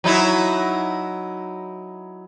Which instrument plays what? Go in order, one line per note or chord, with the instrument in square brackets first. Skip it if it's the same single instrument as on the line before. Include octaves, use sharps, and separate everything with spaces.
[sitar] F#3 D#4 E4